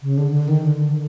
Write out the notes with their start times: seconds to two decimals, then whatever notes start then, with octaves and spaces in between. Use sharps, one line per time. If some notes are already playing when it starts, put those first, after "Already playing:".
0.02 C#3
0.18 D3
0.32 D3
0.48 D#3
0.62 D3
0.93 D3